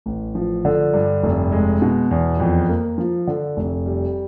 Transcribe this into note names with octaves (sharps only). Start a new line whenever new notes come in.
A1
F3
D3
G2
F1
G#3
B2
E2
F2
A#3
F3
D3
F1
G3